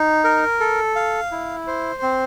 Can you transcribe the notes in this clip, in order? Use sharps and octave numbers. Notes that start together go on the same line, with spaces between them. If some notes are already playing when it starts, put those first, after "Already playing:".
Already playing: D#4
A#4
A4
F5
E4
C5
C4